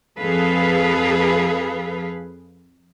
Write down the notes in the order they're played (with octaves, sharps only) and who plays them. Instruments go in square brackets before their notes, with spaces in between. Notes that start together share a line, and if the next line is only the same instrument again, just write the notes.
[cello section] F2 G#4 A4 B4 F5